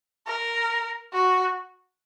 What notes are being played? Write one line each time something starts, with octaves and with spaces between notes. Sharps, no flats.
A#4
F#4